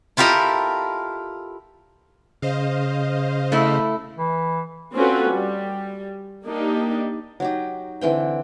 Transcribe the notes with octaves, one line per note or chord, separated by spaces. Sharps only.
E4 F4 G4 A4 A#4 D#5
C#3 C5 D#5 F5
A3 E4
E3
C4 C#4 F4 F#4 A4 B4
G3
A#3 D4 D#4 G4
F#3 D#4 G4
D3 E3 C4 G5